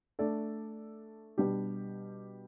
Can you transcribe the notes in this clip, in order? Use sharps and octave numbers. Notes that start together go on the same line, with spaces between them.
A3 D4 A4 D5
B2 G3 D4 G4